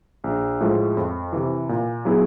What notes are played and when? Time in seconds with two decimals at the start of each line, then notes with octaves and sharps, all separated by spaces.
0.24 A#1
0.61 A2 F3 G#3
0.97 F2
1.33 C3 E3
1.69 A#2
2.05 F#3 B3 E4 G#4